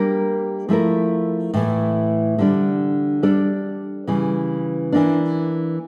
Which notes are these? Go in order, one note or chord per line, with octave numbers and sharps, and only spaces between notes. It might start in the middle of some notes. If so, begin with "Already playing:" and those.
Already playing: G3 A#3 D4 G4 A#4
F3 A3 E4 A#4
A2 E3 A3
D3 G3 D4
G3 D4 A4
C#3 E3 G3
E3 A#3 D4